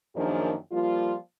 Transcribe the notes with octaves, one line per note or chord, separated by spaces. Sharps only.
F#2 D#3 F3 A#3 D4 G#4
F3 G3 A#3 F4